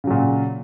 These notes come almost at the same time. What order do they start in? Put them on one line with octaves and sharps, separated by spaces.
C#3 F#3 A#2